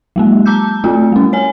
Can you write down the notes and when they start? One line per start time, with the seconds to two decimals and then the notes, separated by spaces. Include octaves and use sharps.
0.16 F#3 G#3 A#3
0.46 A5 A#5 D6 E6 G6
0.84 A3 C4 F4 F#4
1.12 G3 C#4
1.33 C#5 G#5